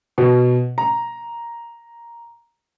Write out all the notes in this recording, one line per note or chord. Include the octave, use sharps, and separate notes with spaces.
B2
A#5